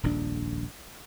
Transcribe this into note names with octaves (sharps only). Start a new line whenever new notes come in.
D#1 A#1 F2 D4